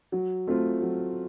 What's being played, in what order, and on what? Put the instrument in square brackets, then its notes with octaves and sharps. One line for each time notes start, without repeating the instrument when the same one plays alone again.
[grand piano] F#3
A3 C4 F4
F#3